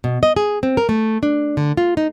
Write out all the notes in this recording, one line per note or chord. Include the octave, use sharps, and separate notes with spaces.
B2
D#5
G#4
C4
A#4
A3
D4
D3
F4
D#4